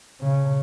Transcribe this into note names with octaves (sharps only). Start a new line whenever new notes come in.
C#3